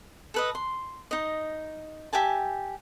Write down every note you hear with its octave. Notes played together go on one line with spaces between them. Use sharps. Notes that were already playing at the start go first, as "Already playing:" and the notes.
A4 B4 D#5
C6
D#4 D#5
G4 E5 G#5 A5